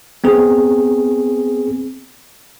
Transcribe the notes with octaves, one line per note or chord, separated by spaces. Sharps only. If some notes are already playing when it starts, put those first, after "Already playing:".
B3 C4 G#4